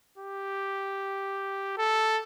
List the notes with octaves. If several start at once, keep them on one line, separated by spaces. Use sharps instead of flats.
G4
A4